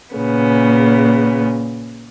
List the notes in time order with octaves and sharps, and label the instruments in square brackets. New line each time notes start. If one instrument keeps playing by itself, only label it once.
[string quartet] A#2 C#3 B3